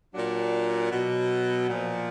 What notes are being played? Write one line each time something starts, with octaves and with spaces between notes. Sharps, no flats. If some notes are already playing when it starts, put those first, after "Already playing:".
A#2 F#3 D4
B2 F#3
A#2 F3